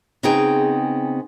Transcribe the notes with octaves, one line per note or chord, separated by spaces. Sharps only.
C#3 B3 C4 D#4 G#4 G5